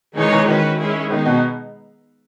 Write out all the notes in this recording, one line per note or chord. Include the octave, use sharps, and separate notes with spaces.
D#3 E3 G#3 D#4 G#4 C#5
E3
D#3 C#4 F#4 B4
G#3 C#4 E4 G#4
D#3 B3 D#4 G#4
B2